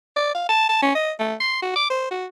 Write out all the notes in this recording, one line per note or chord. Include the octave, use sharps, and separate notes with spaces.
D5
F5
A5
A5
C#4
D#5
A3
C6
F#4
D6
C5
F#4